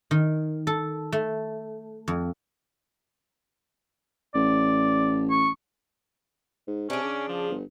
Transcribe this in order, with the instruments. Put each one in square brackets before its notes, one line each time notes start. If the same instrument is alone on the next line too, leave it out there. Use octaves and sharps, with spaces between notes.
[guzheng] D#3
A4
A3
F2
[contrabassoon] A1 [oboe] D5
[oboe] C#6
[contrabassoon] G#2
[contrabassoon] C3 [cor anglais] C#4 [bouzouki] D4 G#4
[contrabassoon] C#3
[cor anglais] F3
[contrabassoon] G1